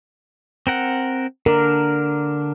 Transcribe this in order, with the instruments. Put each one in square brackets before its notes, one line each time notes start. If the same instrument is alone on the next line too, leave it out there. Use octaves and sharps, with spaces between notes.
[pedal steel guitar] C4 A#4 F#5
[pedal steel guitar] D3 D4 [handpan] A#4